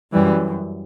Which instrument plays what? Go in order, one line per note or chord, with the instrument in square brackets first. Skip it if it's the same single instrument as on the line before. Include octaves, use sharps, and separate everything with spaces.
[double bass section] F#2 E3 G3